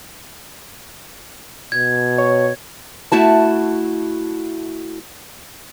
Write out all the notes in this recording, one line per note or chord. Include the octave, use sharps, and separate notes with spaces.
B2 G#6
C#5
A3 E4 F#4 A5